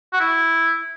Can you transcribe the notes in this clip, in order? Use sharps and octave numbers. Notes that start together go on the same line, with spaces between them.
F#4
E4